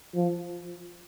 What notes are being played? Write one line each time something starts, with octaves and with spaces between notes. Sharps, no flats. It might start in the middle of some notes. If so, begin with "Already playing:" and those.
F3